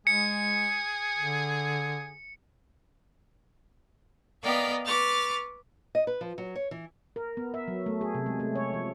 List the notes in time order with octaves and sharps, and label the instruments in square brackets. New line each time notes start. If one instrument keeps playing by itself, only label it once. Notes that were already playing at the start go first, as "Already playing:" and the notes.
[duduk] G#3 [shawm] G#4 [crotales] C#7
[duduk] D3
[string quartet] B3 A#4 D5 D#5 F5 G5
B4 C#6 D6 F6 A6
[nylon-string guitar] D#5
B4
F3
F#3
C#5
E3
[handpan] A#4
B3
E5
F#3
A3
G#4
C3
G#3
A3
C#5
F3